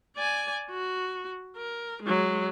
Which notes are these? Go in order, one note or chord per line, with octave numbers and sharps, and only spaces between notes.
D5 G#5
F#4
A#4
F#3 G#3